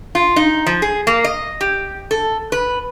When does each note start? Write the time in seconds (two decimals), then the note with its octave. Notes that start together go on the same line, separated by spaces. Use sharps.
0.15 F4
0.36 D#4
0.66 F3
0.82 G#4
1.07 A#3
1.24 D#5
1.61 G4
2.11 A4
2.52 B4